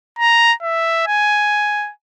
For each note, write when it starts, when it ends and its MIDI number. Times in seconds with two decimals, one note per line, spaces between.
0.19 0.53 82
0.62 1.06 76
1.07 1.91 80